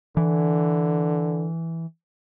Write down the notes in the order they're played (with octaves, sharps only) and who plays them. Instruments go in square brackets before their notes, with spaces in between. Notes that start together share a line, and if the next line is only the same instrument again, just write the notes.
[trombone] D3 [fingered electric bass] E3